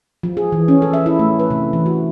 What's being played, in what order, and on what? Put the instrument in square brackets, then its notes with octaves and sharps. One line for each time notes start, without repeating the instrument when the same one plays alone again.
[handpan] F3
G#4
E3
C#4
A4
E5
E4
A3
B4
C3
E3
F#4